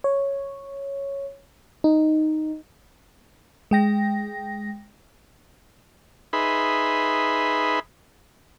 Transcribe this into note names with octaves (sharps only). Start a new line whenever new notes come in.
C#5
D#4
G#3 G5 A#6
D#4 G#4 B4 E5 B5 C6